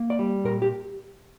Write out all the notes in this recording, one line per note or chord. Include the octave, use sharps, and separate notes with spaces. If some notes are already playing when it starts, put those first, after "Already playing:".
Already playing: A#3
D5
G3
A#2 A#4
G4